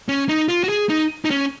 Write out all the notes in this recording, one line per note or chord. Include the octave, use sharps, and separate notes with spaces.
C#4
D#4
F4
F#4
G#4
D#4
D#4
C#4